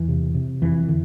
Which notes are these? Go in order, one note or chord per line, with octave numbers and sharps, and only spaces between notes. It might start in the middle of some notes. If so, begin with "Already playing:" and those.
Already playing: E2 E3
C3
C3
F2 E3
D3